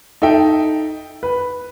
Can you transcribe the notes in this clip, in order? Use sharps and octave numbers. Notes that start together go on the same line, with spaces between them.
D#4 A4 E5 G5
B4